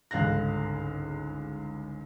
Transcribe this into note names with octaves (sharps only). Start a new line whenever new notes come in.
G1 C#2 G#2 F5 F#6 A#6